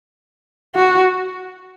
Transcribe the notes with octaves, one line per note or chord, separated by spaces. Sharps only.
F#4